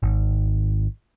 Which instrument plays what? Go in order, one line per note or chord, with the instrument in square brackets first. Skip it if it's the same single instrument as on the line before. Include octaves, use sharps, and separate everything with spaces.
[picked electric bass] G#1